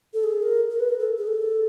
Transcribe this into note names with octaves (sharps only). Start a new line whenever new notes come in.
A4
G#4
A#4
A#4
B4
A#4
A4
G#4
A4